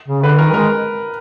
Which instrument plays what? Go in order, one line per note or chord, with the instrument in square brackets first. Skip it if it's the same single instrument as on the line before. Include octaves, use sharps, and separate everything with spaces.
[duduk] C#3
[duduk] D3 [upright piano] B4
[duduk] D#3 [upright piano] A#4
[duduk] G#3 [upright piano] A#4